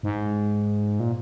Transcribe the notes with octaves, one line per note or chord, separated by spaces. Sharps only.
G#2
A#2